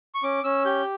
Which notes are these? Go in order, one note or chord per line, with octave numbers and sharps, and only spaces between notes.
C#6
C#4 D6
C#4 E6
G4 G6